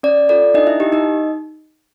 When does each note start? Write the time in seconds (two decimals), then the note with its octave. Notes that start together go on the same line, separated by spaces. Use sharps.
0.03 C#4 D5
0.29 F4 A4 D5
0.54 D4 D#4 D#5
0.67 E4 E5
0.80 D#4 G4 D#5
0.92 D#4 D#5